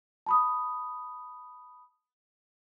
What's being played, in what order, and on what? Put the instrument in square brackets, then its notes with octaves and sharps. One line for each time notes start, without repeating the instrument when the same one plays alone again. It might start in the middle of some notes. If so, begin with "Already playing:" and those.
[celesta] A5 B5 D#6